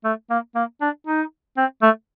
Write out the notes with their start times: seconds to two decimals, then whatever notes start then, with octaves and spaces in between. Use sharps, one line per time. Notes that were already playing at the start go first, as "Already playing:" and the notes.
0.05 A3
0.30 A#3
0.55 A#3
0.81 D4
1.07 D#4
1.57 C4
1.82 A3